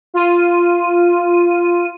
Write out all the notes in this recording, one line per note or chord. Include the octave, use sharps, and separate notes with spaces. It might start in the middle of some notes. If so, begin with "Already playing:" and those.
F4 D#7